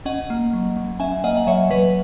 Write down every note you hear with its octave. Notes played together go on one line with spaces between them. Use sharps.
C#4 D#5 F#5
A#3
F#3
F#3
C#4 E5 G#5
A#3 D#5 F#5
F#5
F#3 C#5 E5
F#3 B4 D#5